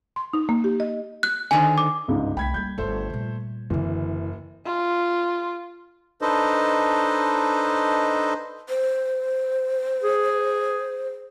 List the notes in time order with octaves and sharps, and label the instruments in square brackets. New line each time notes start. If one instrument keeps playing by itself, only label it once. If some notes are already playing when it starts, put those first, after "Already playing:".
[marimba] C6
D#4
A#3
G4
D#5
[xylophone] F#6
[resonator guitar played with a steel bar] D3 D#3 C5 [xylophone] G#5
[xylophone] D6
[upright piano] G1 C#2 G#2
[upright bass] C2 A3 [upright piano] G5 [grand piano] B5 G#6 B6
[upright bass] G3 A#3 [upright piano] G6
[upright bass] G1 E4 [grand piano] A3 A4 C5
[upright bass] A#2 G3
[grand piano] F#1 [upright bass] D3 C4 [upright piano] E3
[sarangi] F4
[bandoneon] D4 D#4 A4 B4 C5 D#5
[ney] C5
[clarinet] G#4